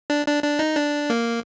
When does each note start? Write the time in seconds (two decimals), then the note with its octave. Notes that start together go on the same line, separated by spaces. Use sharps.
0.10 D4
0.27 D4
0.43 D4
0.59 D#4
0.76 D4
1.10 A#3